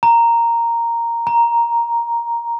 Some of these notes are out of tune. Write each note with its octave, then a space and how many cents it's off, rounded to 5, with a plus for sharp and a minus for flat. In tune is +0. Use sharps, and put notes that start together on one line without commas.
A#5 -5
A#5 +5